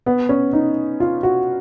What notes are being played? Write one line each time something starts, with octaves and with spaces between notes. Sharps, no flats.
B3
C#4
D#4
F4
F#4